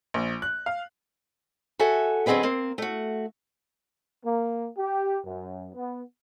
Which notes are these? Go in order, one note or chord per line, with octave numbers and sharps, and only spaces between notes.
A#1
F#6
F5
F#4 A4 E5 G#5
D3 F#3 C4 G#4 B4 D#5
A#3 C4
A3 F#4
A#3
G4
F#2
B3